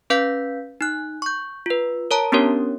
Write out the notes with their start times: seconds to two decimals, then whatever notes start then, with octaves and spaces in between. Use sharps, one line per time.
0.10 C#4 B4 F5 G6 B6
0.81 D#4 F#6
1.22 C#6 G6
1.66 F4 B4
2.11 A#4 C#5 A5 A#5
2.32 B3 C#4 D4 G4 A#4 C#5